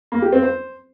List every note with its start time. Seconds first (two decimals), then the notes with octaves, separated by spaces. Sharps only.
0.12 A#3
0.22 G4
0.33 C4
0.43 C5